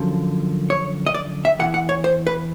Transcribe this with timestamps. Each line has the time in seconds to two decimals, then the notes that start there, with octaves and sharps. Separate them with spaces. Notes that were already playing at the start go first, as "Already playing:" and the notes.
Already playing: F#2 D3 F3
0.70 C#5
1.06 D#5
1.14 D5
1.45 E5
1.59 C#3 E3 F#5
1.64 E2
1.74 F#5
1.89 C#5
2.04 C5
2.27 B4